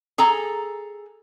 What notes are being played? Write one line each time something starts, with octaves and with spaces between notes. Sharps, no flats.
G#4 A4 G#5 A#5